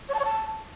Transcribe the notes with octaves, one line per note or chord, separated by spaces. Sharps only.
C#5
A5
C#5
A5